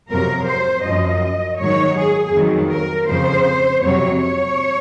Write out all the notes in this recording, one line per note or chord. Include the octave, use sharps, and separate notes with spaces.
F2 C3 F#3 A#4
C5
F#2 F3 D#5
G#2 D#3 F#3 C#5
G#4
F2 D#3 F#3
A#4
F2 C#3 F3 C5
F2 C3 F#3 C#5
C#5